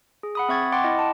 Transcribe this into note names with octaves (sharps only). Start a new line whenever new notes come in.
G#4
F#5 B5 D#6
C4 E5 C#6 G#6 A6
F#5 G5 C6 D6 A6
E4 D#5
A5